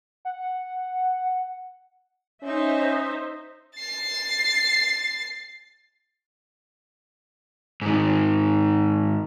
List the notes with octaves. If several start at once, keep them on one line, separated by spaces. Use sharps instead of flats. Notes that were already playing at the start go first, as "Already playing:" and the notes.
F#5
C#4 D#4 C5 E5
A6 C7
G#2 D#3